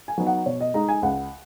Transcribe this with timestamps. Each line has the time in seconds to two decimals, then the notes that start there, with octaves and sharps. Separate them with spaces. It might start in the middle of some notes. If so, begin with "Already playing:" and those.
0.08 G#5
0.18 F#3 B3 D#4
0.27 F#5
0.46 B2 C#5
0.60 D#5
0.74 G#3 D#4 A#5
0.89 G#5
1.02 C#2 F#5